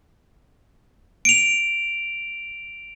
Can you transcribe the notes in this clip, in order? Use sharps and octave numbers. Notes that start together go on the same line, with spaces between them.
D7 F7